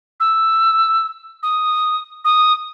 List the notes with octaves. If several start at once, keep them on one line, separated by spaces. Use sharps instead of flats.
E6
D#6
D#6